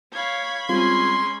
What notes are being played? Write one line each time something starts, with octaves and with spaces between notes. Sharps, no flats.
C#5 F5 B5 G#6
G3 G#3 C4 C#4 F4 C6